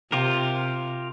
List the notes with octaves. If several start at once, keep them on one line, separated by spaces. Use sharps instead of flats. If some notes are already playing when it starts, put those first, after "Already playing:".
C3 F4 G4 A#4